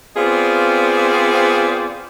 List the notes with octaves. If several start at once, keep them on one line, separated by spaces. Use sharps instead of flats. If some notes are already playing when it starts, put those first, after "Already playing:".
B3 C4 F4 G#4 C5 D5